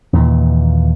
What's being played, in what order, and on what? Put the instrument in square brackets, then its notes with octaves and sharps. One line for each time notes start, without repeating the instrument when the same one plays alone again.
[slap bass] D#2 A#2 E3